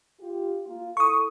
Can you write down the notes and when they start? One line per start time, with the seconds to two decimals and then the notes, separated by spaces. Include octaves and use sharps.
0.21 F4 G4
0.66 A#3 F4
0.97 E4 A4 C#6 D#6